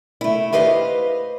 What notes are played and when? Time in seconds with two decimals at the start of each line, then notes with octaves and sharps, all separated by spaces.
0.21 A3 E4
0.53 G4 B4 C5 D#5 F5